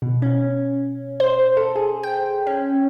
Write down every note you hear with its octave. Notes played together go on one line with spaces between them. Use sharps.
B2
C#4
C5
A4
G#4
G5
C#4